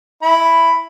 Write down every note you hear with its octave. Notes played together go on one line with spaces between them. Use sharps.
E4 B5